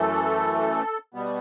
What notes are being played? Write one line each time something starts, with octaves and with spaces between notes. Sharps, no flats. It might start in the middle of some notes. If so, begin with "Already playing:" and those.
Already playing: F#2 E3 A3 A4
B2 G3 B3